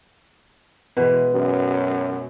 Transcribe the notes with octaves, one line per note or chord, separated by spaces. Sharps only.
B2 E3 G#3
F#2